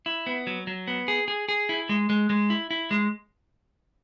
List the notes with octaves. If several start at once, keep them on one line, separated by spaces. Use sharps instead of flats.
E4
B3
F#3
F#3
B3
G#4
G#4
G#4
E4
G#3
G#3
G#3
E4
E4
G#3